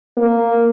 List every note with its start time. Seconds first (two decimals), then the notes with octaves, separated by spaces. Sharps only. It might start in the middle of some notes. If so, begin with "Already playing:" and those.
0.17 A#3